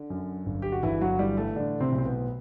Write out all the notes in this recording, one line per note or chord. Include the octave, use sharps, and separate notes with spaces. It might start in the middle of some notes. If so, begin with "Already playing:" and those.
Already playing: D3
F#2
G1
G4
F#4
G1 E3 E4
F#3 F#4
E3 G3 G4
A3 A4
A2 D3 D4
C3 C4
B1
C4
B3